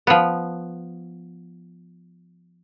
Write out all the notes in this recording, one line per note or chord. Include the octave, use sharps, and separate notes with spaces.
F3 B3